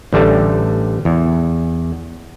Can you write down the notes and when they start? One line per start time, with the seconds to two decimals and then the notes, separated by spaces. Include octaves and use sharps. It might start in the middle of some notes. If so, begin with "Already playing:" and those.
0.13 A1 D3 G3 A3
1.05 E2